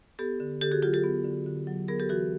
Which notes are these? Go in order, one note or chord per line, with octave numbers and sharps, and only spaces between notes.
B3 G4 A4
D3
D3 G4 A4
F#4 G#4
F#3 F4 G4
G4 A4
B3
D3
D3
F#3
B3 G#4 A#4
G4 A4
E3 F#4 G#4